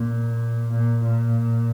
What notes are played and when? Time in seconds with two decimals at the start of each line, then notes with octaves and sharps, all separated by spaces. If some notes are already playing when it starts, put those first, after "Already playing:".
Already playing: A#2
0.72 A#2
1.03 A#2